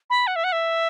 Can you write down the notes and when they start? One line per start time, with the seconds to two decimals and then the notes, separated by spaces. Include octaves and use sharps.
0.10 B5
0.27 F#5
0.36 E5
0.44 F#5
0.52 E5